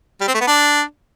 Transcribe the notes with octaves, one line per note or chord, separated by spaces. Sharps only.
G3
C4
A3
B3
D4